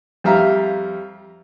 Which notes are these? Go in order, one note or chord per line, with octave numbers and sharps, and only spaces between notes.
F2 G3 E5 F5 A#5